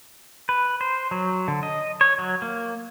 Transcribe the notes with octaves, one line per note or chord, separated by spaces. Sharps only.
B4
C5
F#3
D3
D#5
C#5
F#3
A#3